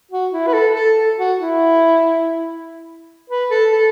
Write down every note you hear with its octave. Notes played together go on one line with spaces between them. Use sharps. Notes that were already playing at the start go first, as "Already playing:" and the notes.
F#4
E4
B4
A4
A4
A4
F#4
E4
B4
A4
A4